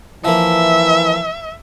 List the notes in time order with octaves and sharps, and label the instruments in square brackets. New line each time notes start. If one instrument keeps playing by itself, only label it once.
[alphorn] E3 [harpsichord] F3 A#3 [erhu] E5